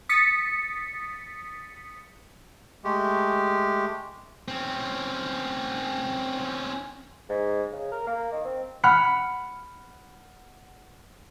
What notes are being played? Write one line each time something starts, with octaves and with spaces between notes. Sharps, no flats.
D#6 A6 B6 C#7
G#3 A3 G4
C4 C#4
G#2
C#3
A#4
A#3
D#3
C4
F#5 B5 F6